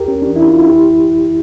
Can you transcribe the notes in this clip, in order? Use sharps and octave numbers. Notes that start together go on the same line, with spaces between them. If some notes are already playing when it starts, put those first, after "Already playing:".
Already playing: E2 G4 A#4
C#4
E3 D4
E4
F4
F2 E4 G4